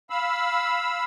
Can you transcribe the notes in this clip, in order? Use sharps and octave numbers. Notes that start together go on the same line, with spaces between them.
F5 B5 E6